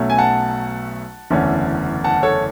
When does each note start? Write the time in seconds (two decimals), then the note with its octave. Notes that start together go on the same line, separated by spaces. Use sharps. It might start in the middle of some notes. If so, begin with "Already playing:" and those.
Already playing: B1 B2 F#3 A3 C#4
0.10 G#5
0.18 F#5 A5
1.30 F#1 E2 D3 A3 C#4
2.04 F#5 A5
2.23 A4 C#5